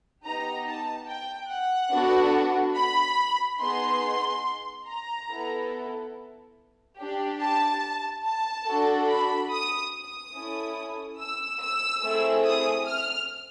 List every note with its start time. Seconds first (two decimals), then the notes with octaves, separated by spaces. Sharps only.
0.23 B3 D#4 G4 A#5
0.65 A5
1.08 G5
1.49 F#5
1.91 B3 D4 F#4 A4
2.76 B5
3.60 B3 D#4 G#4 C6
4.86 A#5
5.28 B3 E4 A4
6.98 D4 G4
7.40 A5
8.24 A5
8.66 D4 F#4 A4
9.08 B5
9.50 D#6
9.93 D#6
10.35 C#4 E4 A4
11.19 E6
11.61 E6
12.02 A3 C4 E4 G#4
12.45 D#6
12.87 F6